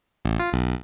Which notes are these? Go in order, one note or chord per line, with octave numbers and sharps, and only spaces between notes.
A1
F4
B1